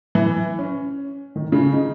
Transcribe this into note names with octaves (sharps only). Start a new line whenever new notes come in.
E3
C#4
D#3
C#3
D#4